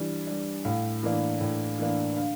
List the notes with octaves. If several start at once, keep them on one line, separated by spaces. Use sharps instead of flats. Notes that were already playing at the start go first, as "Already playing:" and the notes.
Already playing: E3 G3 D4
G3 D4
A2 F5
E3 A#3 D4
A2
E3 A#3 D4
D3 F5